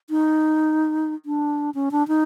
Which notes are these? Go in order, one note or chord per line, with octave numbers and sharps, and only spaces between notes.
D#4
D4
C#4
D4
D#4